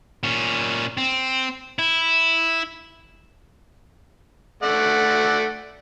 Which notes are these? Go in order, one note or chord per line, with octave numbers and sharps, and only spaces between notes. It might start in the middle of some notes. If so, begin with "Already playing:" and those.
A#2 C#4
C4
E4
A3 D5 F#5